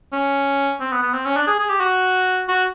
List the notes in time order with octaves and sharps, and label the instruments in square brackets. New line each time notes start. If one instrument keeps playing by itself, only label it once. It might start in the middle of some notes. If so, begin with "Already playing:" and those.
[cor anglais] C#4
C4
B3
B3
C4
C#4
D4
G#4
G#4
G4
F#4
F#4